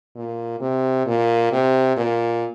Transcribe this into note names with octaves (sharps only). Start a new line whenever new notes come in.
A#2
C3
A#2
C3
A#2